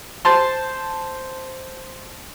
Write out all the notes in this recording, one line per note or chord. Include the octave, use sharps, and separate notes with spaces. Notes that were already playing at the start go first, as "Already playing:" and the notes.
C5 A5 C6